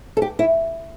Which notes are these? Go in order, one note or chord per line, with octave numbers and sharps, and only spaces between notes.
A4
G4
E4